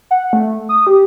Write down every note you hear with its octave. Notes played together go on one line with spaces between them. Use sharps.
F#5
A3
D#6
G4